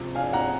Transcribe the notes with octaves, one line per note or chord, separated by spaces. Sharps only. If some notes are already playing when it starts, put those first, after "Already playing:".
Already playing: C#2 C3 F3
F5 G#5
F#5 A#5